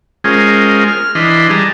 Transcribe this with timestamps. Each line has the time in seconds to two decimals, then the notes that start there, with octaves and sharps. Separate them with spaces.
0.24 G#3 C#4 F4 G#4 A#4 C5
0.88 F6
1.15 E3 D4 D#5 B5 C6
1.50 G3 G#4 A5 A#5